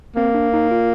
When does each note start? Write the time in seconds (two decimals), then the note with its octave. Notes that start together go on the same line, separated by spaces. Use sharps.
0.16 A#3 C4
0.34 D4
0.54 D#4
0.71 F4